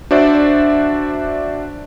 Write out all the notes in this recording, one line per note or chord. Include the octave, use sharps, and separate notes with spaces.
D4 F#4 C5 D5 E5